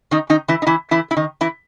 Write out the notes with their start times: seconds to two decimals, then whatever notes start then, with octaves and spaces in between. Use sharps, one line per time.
0.11 D#3 D#4
0.30 D#3 D#4
0.48 E3 E4
0.62 D#4
0.67 E3 E4
0.91 E3 E4
1.11 E4
1.17 D#3 D#4
1.41 E3 E4